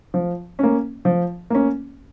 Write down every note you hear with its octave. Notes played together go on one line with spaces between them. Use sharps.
F3
A#3 C#4
F3
A#3 C#4